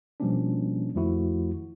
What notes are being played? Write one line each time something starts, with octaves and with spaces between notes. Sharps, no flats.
B2 F3 G3 A#3 C#4 D4
F2 D#3 F3 A3 E4 F#4